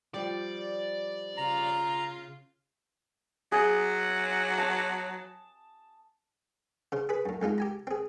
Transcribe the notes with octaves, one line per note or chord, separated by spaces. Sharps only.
F3 G3 D5
C#3 F4 A#5
F#3 G#4
A5
C#3 C5
G#4 B4 B5
F#2 A2
F2 G#3 D#4 F4
G4 G#5 A#5
C4 G#4